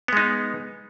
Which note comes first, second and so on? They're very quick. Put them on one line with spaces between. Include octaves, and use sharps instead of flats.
B3 G#3 D#4